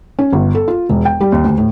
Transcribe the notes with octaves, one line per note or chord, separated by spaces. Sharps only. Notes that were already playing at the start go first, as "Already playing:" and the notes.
C#4
G1
A4
F4
E1
G5
G3
D#2
D2
A2